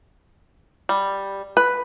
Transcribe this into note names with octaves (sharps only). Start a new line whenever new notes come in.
G3
B4